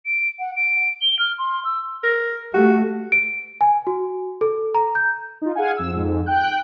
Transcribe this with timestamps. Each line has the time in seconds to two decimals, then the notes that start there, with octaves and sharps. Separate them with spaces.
0.06 D7
0.40 F#5
0.56 D7
1.02 G7
1.19 F6
1.38 C6
1.65 E6
2.03 A#4
2.54 A3 F#4 G4
3.12 D7
3.61 G#5
3.87 F#4
4.41 A4
4.75 A#5
4.95 G6
5.42 D#4 F4
5.55 G#4 F5 F#5 G#5
5.76 F2 E6
5.93 F2 G#2
6.26 G5 F#6 G6